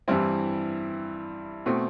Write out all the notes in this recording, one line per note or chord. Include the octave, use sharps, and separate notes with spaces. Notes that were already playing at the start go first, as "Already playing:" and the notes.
G2 E3 G3 C4 E4
B2 A3 C4